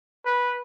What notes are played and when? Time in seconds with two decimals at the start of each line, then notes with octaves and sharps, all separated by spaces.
0.25 B4